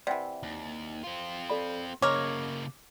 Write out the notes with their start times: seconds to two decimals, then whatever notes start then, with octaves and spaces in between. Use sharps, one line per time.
0.07 C3 E3 D5 F#5 G5
0.43 D#2
1.03 C4 F4
1.50 A4 D5 B5
2.02 C#3 G#3 A#3 A#4 C#5 D6